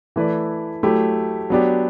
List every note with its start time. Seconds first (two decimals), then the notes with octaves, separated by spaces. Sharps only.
0.16 E3 A3 E4 B4 D5
0.83 F#3 A3 E4 G4
1.50 F#3 B3 D4 G4